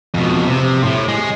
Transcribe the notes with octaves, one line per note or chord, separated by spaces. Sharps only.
F2 B2
C3
A2
G#3